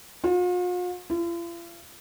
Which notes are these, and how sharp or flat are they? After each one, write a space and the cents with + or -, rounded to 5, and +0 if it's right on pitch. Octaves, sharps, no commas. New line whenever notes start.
F4 +45
F4 -45